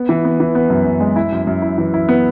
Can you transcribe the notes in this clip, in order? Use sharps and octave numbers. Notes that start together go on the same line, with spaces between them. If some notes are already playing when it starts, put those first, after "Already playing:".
Already playing: B3
E3
B3
E3
B3
F#2
F#2
G#3
E4
F#2
F#2
E4
E3
E4
B3